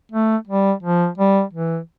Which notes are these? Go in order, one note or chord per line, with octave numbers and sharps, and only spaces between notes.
A3
G3
F3
G3
E3